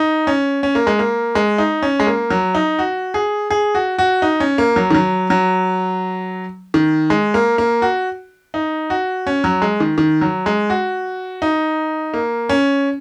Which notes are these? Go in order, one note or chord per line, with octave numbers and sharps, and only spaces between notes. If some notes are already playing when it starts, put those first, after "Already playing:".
Already playing: D#4
C#4
C#4
A#3
G#3
A#3
G#3
D#4
C#4
G#3
A#3
F#3
D#4
F#4
G#4
G#4
F#4
F#4
D#4
C#4
A#3
F#3
D#3
F#3
F#3
D#3
G#3
A#3
A#3
F#4
D#4
F#4
C#4
F#3
G#3
D#3
D#3
F#3
G#3
F#4
D#4
A#3
C#4